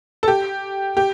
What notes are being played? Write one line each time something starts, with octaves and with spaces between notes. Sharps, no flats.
A4
G4
G4